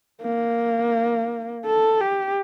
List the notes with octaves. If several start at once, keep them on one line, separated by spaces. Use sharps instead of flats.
A#3
A4
G4